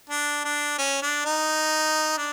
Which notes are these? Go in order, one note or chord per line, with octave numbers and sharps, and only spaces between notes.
D4
D4
C#4
D4
D#4
D4